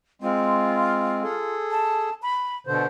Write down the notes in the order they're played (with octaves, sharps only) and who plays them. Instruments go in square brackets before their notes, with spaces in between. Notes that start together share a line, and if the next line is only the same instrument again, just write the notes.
[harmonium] G#3 C4 [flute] F4
[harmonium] G#4 A4
[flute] A5
B5
[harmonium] B2 D3 C5 [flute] A4